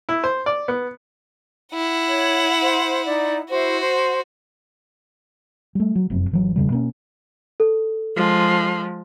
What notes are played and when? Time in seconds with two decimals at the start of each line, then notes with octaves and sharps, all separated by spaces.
0.09 E4
0.24 C5
0.46 D5
0.68 B3
1.74 E4 F#5
2.06 C#5
2.62 C5
3.06 D#4 D5
3.50 E4 F#4 C5
3.81 C5
5.75 G3 A3
5.95 F#3
6.10 F1 F#2 C4
6.31 G#1 E3 F#3
6.56 E1 C#3 G3
6.70 B2 A#3 C#4
7.60 A4
8.15 F3 G#3